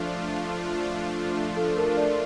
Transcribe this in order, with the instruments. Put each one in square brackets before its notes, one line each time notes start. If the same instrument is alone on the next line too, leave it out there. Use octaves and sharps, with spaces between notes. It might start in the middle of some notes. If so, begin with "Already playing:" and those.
Already playing: [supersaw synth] F3 A3 D4 F4 [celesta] A4
[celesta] A4
A#4
D5